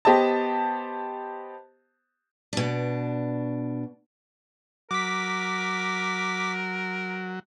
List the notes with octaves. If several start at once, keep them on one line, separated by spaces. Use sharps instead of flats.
B3 G4 C5 D#5 A5
B2 D4
F#3 A#4 D6 B6